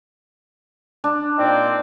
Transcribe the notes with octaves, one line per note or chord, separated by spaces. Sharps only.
D4
A#2 C4 D#4 D5